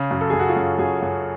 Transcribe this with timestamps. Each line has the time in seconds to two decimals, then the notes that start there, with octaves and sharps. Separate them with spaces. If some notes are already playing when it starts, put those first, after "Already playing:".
Already playing: C#3
0.11 F#2
0.21 A4
0.30 F#2 G#4
0.40 F#4
0.49 F4
0.57 F#2
0.79 F#2 G#4
1.02 F#2